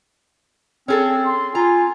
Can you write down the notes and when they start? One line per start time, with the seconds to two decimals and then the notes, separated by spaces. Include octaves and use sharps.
0.88 C4 C#4 G#4 A4
1.26 C6
1.55 F4 G#5 A#5